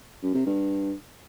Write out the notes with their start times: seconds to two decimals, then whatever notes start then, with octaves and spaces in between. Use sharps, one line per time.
0.23 F#2
0.34 C3
0.46 G2